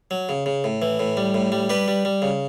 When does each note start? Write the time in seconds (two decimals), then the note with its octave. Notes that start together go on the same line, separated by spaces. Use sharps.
0.11 F#3
0.29 C#3
0.46 C#3
0.64 A2
0.82 E3
1.00 A2
1.17 G3
1.34 A2
1.52 G3
1.69 G3 G4 B4
1.88 G3
2.05 G3
2.22 C#3